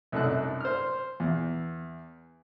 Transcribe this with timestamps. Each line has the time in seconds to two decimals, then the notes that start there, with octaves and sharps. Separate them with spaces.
0.12 C2 F#2 A3 D#4 E6 F#6
0.61 C5 F6
1.20 E2